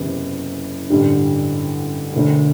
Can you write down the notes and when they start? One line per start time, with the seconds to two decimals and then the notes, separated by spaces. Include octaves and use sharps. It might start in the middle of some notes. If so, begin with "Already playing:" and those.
Already playing: F#1 E2 C3 E3
0.89 A1 G2 D3 G3 D4
2.13 E1 D2 D3